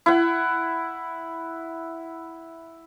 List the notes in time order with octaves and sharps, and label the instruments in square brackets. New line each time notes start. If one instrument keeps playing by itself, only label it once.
[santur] E4 F#5